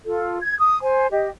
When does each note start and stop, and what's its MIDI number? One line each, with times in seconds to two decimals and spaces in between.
0.06 0.38 65
0.06 0.38 69
0.41 0.57 92
0.60 0.79 87
0.82 1.06 72
0.82 1.06 80
1.11 1.29 67
1.11 1.29 75